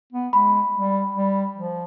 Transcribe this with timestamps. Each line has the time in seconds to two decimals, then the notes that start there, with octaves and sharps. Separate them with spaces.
0.13 B3
0.33 G#3 B5
0.74 G3
1.15 G3
1.56 F3